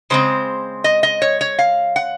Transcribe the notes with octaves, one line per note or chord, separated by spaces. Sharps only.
C#3 G#3 C4 C5
D#5
D#5
C#5
C#5
F5
F#5